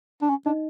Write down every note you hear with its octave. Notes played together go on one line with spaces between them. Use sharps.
D4
C#4
D4 D#4 D#5